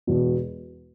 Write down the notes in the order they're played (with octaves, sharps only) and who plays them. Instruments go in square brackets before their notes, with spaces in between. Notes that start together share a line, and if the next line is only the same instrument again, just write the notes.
[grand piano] E1 E2 B2